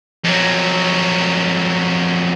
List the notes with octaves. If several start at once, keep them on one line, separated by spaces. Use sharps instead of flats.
F2 F#3